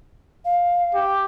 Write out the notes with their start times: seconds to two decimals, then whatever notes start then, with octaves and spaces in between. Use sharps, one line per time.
0.44 F5
0.94 G4